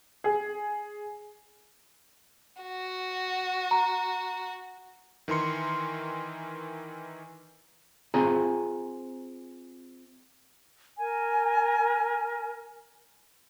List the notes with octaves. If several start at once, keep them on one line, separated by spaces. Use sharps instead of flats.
G#4
F#4
A#5
D#3 E3 A#4 C6 C#7
C4 F4 G#4 G#5 A#5
A#4 G#5